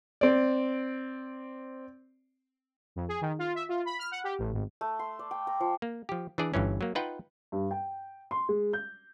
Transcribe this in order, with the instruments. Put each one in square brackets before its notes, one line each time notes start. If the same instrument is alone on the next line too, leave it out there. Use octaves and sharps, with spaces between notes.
[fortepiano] C4 D5
[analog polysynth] F2
G#4
D#3
F4
E5
F4
B5
F6
F#5
G4
A1
G#1
[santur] A3
C6
D5
G5
A#5
F3
[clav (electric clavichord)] A#3
F3 G4
E3 D4 G#4 D5
G1 G2 E3 C#4
F#3 A#3
D#4 F4 B4 F#5 G5
[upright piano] G2
G5
C6
G#3
G6